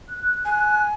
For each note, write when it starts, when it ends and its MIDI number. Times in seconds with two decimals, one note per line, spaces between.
0.10 0.82 90
0.45 0.94 80